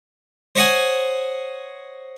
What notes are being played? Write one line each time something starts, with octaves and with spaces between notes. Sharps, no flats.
C5 C#5 D#5 F#5 G#5